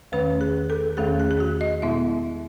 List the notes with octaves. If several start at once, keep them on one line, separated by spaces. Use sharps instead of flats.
E2 D#3 A3 C#4 B4
G#4
A4
E2 D#3 A3 C#4 G#4
G#4
G#4
F#4
D#5
B2 G#3 B3 E4 E5